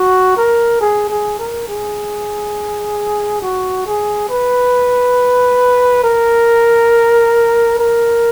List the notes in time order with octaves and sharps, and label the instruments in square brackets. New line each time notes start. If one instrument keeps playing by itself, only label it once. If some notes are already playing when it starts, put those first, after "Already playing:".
Already playing: [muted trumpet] F#4
A#4
G#4
G#4
A#4
G#4
F#4
G#4
B4
A#4
A#4